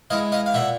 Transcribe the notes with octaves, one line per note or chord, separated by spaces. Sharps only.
E3 G#3 D#5 F5
D#5 F5
F5
A#2 E5 F#5